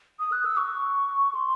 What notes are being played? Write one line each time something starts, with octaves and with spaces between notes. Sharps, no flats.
D#6
F#6
E6
C#6
C6